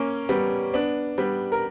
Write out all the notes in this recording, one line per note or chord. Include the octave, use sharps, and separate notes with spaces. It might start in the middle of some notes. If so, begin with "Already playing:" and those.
Already playing: A#3 C#4
G3 B3
B3 D4
G3 B3
A#4